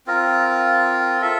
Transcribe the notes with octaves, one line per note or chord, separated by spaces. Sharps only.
C4 F4 A#4
F4 A4 E5